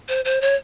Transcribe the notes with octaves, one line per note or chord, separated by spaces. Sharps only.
C5
C5
C#5